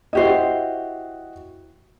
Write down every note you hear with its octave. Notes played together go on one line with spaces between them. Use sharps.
E4 F#4 G4 C5 D#5